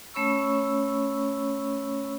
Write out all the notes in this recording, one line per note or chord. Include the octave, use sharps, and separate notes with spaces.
A3 C#4 C#5 B5 C#6 E6